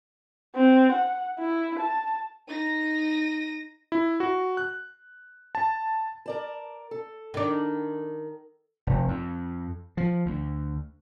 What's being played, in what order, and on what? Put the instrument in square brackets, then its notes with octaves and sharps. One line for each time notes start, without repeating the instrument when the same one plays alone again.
[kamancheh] C4
F#5
E4
A5
[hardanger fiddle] D#4 [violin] A#6 D#7
[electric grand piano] E4
F#4
F#6
A5
[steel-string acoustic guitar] A#4 D5 A5
A4
[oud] D#3 D4
[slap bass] F1
F2
F3
D2